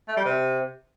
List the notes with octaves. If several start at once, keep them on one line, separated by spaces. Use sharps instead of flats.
A3
G3
C3